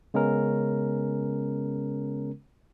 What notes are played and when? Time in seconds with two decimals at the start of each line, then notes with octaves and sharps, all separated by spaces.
0.14 C#3 G#3 B3 C#4 A#4